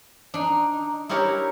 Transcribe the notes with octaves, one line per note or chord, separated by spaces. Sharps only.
D4 D#4
D#4 E4 G4 A#4 C#5